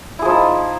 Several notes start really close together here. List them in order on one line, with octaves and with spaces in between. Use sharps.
E4 G#4 F3 D#4